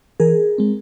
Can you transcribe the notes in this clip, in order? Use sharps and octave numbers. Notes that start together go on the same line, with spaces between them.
E3 G#4 A#4
G#3 C4